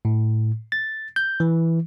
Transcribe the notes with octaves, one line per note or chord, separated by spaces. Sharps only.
A2
A6
G6
E3